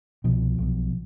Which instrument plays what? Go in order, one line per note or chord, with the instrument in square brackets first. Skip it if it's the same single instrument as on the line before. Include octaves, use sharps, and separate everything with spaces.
[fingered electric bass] C2 B2 F3
B1 B2